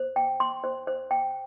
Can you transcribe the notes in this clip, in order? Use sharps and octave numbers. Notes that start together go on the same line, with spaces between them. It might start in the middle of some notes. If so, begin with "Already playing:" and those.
Already playing: C5
G5
C6
C5
C5
G5